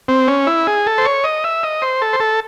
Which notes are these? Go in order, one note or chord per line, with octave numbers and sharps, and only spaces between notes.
C4
C#4
E4
G#4
A4
C5
C#5
D#5
E5
D#5
C5
A4
C5
A4